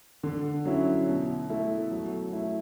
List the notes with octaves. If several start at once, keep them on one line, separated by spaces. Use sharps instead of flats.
D3
F#3 C#4 E4
B2
A3 E4
F#3
A3 E4